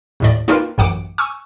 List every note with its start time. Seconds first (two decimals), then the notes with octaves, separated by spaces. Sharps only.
0.20 D#2 A2 D5
0.48 A#3 D#4 F4 A#4 B4 G5
0.78 A1 F#2 F#5 D6 D7
1.18 G#5 C#6 E6